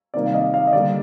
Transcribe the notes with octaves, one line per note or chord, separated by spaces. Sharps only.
C3 D#3 G3 A#3 D5
F5
D#5
F5
D#5
D3 G3 A#3 D5